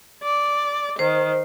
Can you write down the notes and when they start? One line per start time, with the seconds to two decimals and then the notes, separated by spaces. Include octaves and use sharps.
0.23 D5
0.99 D#3 C5